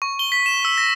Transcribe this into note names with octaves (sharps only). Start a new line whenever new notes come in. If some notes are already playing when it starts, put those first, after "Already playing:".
C#6
G7
B6
E7
E6
A#6